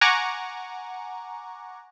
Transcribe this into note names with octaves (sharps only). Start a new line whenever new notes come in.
F#5 G#5 A#5 C#6 D6